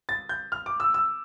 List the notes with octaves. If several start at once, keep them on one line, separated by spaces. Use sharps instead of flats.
A6
G6
F6
D6
E6
E6